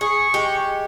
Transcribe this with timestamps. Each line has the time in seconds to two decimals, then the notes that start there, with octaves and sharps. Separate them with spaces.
0.01 G#4 C#6
0.34 G#3 G4